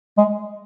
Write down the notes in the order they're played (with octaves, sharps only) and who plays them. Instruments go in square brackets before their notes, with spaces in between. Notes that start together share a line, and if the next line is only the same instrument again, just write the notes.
[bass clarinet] G#3